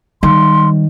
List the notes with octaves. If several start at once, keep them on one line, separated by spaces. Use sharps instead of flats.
D#3 G3 C6